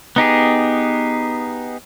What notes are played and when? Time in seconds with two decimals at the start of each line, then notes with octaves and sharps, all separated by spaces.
0.16 B3 D#4 G4 G#4